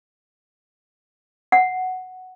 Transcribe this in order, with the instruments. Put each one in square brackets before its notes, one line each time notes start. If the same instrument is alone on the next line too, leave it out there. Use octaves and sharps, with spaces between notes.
[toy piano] F#5